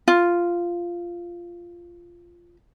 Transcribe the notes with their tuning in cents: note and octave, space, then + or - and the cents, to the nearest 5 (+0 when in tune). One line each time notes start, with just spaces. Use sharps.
F4 -10